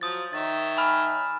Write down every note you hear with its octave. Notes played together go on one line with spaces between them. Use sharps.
F3 F#3 D#6 A6
D#3 C#5 E5 A6
G#5 B5 F6